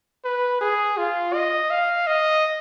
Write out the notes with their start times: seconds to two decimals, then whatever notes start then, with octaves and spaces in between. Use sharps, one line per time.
0.25 B4
0.61 G#4
0.98 F4
1.34 D#5
1.71 F5
2.07 D#5